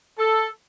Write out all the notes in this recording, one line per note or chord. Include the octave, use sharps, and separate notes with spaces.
A4